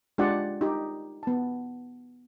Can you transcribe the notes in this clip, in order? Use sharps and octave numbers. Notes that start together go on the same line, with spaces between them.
G#3 D4 F4 G4 D5 F#5
D#4 G4
B3 A5